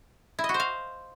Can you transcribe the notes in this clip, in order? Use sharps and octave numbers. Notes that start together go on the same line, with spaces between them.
E4
D#5
F#4
C5
F5